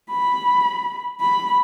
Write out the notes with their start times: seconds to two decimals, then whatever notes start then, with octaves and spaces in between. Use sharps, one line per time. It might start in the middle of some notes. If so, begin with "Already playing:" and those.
0.10 B5
1.21 B5